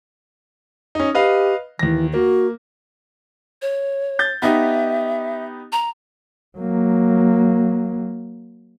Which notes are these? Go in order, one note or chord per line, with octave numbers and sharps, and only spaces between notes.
C#4 D#4
G4 B4 D#5 F5
D#2 E3 A#6
A#3 F#4
C#5
G6 A6
B3 D#4 G4 E5
A#5
F#3 A#3